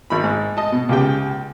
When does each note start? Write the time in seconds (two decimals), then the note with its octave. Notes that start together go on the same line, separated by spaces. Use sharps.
0.10 G#1 B5
0.24 G#2
0.57 D#5 A5
0.72 B2
0.89 C#2 C#3 G4 G5